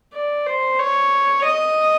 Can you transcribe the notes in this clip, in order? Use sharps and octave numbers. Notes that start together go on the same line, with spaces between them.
D5
C5
C#5
D#5